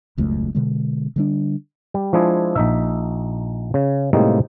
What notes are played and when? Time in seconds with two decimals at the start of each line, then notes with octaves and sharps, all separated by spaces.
0.17 E1 C#2 F#2 A3
0.55 B2 D3 G#3
1.16 D3 G3 D4
1.94 G3
2.13 F3 G#3 D4 E4 G#4
2.55 A#1 D#4 E5
3.74 C#3
4.13 A2 C3 G3 G#3 A#3 D#4